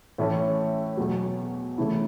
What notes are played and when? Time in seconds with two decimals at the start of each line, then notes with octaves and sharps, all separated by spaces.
0.18 A2 E3 A3 C#4
0.97 E2 B2 F#3
1.78 C#3 E3 A3 E4